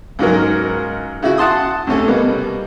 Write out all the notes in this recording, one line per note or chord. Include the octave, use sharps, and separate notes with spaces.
C#2 G#2 F#3 A#4
C#3 E4 F#4
F#5 A5 C6 D#6
D2 C3 C#4 A4
B2 G3 A#3 B3